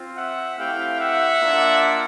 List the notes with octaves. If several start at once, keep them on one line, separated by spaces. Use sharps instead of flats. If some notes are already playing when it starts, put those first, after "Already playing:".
Already playing: C4 F4
E5 F#5
A3 C4 E4 G4 F5 G5
E5 F#5
A#3 D4 F4